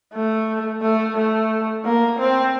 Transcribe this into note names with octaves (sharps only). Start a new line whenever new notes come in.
A3
A3
A3
A#3
C4